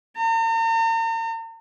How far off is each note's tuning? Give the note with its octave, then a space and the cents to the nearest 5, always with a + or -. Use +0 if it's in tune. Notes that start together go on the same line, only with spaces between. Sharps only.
A#5 -45